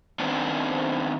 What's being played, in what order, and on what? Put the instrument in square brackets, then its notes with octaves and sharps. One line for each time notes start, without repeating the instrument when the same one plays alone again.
[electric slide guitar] D#3 B3 C4 D4